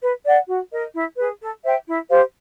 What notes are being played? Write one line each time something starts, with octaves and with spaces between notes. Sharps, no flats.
B4
D5 F#5
F#4
A#4 D#5
E4
G#4 B4
A4
C5 E5 G5
E4
G4 C5 F5